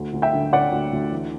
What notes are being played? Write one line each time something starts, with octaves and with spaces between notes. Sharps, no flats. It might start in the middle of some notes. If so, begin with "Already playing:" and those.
Already playing: D2
D2
E5 G5
D3
D3 D5 F#5
D2
D2
E3